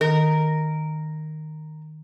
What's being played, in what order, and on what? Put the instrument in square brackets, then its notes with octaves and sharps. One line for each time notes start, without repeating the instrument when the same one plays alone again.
[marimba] D#3 [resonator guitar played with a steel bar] A#4